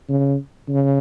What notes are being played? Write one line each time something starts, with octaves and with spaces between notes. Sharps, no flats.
C#3
C#3